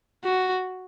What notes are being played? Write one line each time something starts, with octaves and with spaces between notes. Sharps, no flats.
F#4